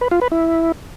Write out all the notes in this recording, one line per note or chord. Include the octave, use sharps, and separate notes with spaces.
B4
F4
B4
E4